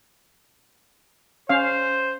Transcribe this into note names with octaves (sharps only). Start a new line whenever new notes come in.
C#4 C5 F5